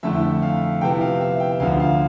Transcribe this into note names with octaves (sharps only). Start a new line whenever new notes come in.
F2 D3 A3 E4 E5
F5
C3 F3 B3 E4 G5
F5
E5
G5
D2 D3 F3 F5
F5